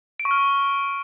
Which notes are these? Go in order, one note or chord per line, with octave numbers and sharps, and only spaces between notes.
D7
C#6
F6